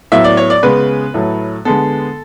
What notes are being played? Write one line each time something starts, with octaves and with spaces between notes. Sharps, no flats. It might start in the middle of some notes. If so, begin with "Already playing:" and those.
A2 F#3 B3 E5
D5
C#5
D5
C#3 G#3 B3 B4
A2 F#3 A3
D3 G#3 B3 A4